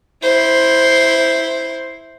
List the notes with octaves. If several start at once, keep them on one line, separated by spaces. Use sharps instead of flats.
E4 C5